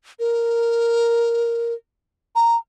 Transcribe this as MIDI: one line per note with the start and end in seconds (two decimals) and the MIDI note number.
0.19 1.74 70
2.35 2.57 82